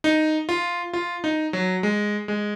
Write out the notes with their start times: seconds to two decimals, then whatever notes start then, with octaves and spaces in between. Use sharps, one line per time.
0.04 D#4
0.49 F4
0.93 F4
1.24 D#4
1.53 F#3
1.83 G#3
2.28 G#3